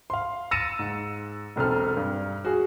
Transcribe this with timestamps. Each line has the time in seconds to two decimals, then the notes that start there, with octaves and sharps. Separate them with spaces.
0.10 F5 C6
0.51 E6 A6 A#6 C#7 D#7 E7
0.79 G#2
1.56 E1 B1 C4 A4 F6
1.97 G2
2.45 F#4 G#4